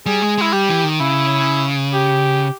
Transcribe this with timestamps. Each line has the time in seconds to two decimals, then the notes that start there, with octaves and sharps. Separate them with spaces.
0.06 G3 G#4
0.22 G#3
0.38 G#3 E4
0.53 G3 G4
0.69 E3
0.84 D#3
1.00 C#3 E4
1.93 G4